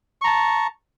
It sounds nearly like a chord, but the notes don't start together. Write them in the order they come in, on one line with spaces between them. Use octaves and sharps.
C#6 A#5 A5